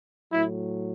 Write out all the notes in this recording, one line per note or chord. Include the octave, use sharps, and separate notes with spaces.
A2 F#3 E4